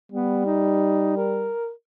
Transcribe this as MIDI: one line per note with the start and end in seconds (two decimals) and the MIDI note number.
0.12 1.52 55
0.12 0.42 59
0.45 1.17 63
1.17 1.71 70